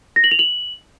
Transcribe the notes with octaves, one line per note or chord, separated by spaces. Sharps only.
A#6
F#7
F7
F#7